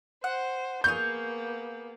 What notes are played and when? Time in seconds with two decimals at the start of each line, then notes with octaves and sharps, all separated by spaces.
0.24 C5 F#5
0.84 A#3 B3 G#4 F5 C#6 G6